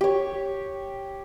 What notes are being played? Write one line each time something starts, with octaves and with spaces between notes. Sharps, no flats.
G4 C#5